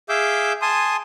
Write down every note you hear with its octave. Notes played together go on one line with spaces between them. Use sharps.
G#4 E5 F5 D6 E6 G6
G#5 A5 C6 D#6